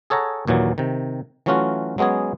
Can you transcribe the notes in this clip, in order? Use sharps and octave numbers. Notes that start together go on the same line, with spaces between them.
G#4 A4 C#5 F#5 A#5
D#2 A#2 E3 F#3
C3 D#3
E3 F#3 A3 C#4 F4 F#4
F#3 G#3 B3 C#4 G#4